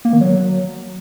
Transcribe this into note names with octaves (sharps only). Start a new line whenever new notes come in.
A#3
D#3
F#3